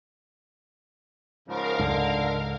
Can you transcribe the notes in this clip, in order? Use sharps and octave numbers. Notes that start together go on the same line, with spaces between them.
G#2 C#3 F3 A#4 F5
C#2 G#2 D3